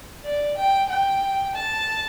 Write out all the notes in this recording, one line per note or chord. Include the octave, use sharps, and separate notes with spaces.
D5
G5
G5
A5